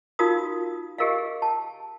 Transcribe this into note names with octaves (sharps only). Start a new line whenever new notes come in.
D#4 F4 F#4 A#4 F5 D#6
G4 G#4 A#4 D#5 F5
A5